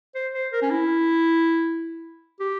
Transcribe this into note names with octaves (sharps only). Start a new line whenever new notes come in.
C5
C5
A#4
C#4
E4
G4